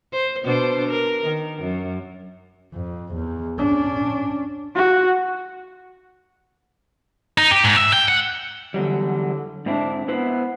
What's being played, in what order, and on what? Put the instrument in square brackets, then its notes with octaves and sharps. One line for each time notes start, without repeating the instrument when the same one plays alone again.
[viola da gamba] C5
B2 D4 C5
A#4
D#3
F#2
[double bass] F2
E2
C#4 D4
[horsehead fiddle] F#4
[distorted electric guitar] D#4
G4
G#2
E5
G5
F#5
[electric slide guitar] E2 F#3 G3 [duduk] D3
[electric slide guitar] G#2 C4 E4 [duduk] D4
[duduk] B3 [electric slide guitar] E4 B4 C5